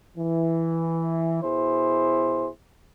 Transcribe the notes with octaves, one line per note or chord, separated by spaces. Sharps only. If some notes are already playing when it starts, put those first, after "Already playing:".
E3
B2 E4 G#4 C5